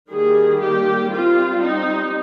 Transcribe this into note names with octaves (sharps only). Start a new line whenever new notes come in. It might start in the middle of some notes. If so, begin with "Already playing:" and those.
D#3 G3 A#3 G#4
G4
G3 C4 F4
D#4